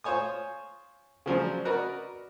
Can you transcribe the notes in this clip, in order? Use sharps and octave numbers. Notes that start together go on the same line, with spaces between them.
F4 C5 C#5 G#5 D#6
C#3 F3 F#3 D4
F#4 A#4 B4 D5 D#5